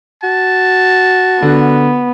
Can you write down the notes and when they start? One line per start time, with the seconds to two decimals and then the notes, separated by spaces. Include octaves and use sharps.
0.23 F#4 A5
1.42 D3 B3